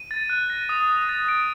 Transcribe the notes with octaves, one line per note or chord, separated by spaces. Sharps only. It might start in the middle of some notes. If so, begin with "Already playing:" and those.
Already playing: D#7
A6
F#6
A#6
D#6
D#6
A6
D7